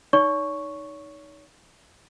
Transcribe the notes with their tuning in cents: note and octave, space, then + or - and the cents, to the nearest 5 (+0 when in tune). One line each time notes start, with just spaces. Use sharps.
D#4 +0 C#5 +35 C#6 +0